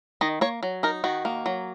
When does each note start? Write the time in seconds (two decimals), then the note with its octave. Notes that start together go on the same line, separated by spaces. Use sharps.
0.21 D#3 D#5
0.41 A#3 C#5
0.63 F#3
0.83 D#4 A#4
1.04 D#3 F#4
1.25 A#3
1.46 F#3